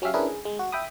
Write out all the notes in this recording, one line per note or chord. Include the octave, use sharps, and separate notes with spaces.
F#3 C#4 G4 E5 F5
C#4 D4 E4 G#4 A#4 B4
G#4
G#3
F#4
E5 G5 B5 D#6